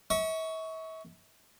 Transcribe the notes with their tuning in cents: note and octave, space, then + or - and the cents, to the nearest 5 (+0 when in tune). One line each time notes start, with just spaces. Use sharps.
E5 -40 C#6 +10